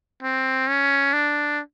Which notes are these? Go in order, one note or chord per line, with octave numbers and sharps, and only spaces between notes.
C4
C#4
D4